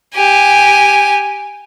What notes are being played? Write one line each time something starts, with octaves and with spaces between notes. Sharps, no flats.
G4 G#5